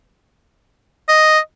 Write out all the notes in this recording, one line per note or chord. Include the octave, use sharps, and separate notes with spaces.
D#5